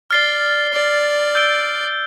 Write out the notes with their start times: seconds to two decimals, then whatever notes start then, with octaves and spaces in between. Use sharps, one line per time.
0.11 D5 F6 A6 C7 G7
0.73 D5
1.35 E6 G6 D7 G7